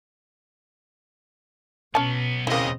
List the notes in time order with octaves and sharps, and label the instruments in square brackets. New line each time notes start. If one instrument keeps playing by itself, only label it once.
[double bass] B2 [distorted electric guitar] F#3 B3 [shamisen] C#4 A5
[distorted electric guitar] D#2 A#2 [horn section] C#3 C4 D#5 [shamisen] A#3 E4